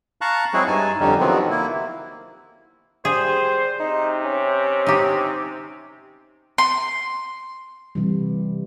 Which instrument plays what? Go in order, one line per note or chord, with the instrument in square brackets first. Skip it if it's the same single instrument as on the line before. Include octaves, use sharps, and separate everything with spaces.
[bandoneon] F5 A5 A#5 C#6 F#6
F#3 G#3 C4 E4 F#4 G#4
G2 D#4 G#5 A5
F2 D3 G3 C#4 D#4
C3 D#3 F3 F#3 B3 C4
A#3 E4
[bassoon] G3 [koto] G#4 [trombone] C5
[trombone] C3 [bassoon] D#4
[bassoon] C#4
[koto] D#4 G4
[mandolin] C6
[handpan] C3 E3 G3